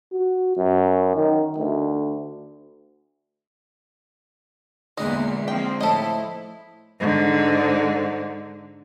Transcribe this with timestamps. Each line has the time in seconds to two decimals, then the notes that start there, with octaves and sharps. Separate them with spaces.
0.13 F#4
0.57 F#2
1.15 D#3
1.58 D2
4.97 E2 A#2 D3 G#3 D4 D#5
5.48 F3 A#3 C4 G5
5.81 A2 F3 E4 A4 D#5
7.00 G#2 D3